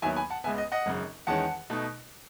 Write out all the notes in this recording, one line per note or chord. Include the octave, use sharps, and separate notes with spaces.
D#2 D#3 F#3 B3 E5 G#5
G#5 B5
F#5 A5
C#2 C#3 G#3 B3 E5 G#5
D#5
D#5 F#5
G#1 F#2 C#3
E2 D#3 G#3 C#4 F#5 A5
B2 A3 D#4